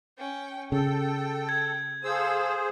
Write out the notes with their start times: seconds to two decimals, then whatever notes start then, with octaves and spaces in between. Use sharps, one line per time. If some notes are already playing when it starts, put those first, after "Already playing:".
0.18 C#4 G5
0.72 C#3 A4 G5
1.49 G#6
2.04 G#4 A4 C5 F5 E6